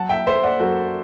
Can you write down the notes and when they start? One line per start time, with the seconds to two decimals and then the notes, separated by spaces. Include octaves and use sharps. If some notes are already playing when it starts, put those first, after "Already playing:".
Already playing: F#3 F#5 A5
0.09 E5 G5
0.26 A3 C5 E5
0.43 D5 F#5
0.60 F#2 F#4 A4